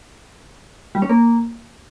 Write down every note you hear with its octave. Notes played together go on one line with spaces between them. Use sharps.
G3
C#4
A#3